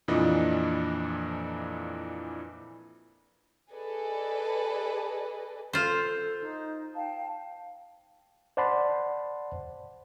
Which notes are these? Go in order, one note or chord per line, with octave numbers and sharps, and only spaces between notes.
F2 A#2 E3 F3 D4 D#5
G#4 A4 B4 D5 D#5 G#5
F4 A4 C5
D#4
F5 G5 A5
C5 D5 F#5 A5 B5 C6